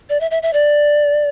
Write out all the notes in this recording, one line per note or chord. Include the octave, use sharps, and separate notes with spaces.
D5
E5
E5
E5
D5